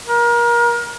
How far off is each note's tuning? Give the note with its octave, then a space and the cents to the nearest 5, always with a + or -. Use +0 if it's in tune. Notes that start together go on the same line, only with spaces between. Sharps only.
A#4 +30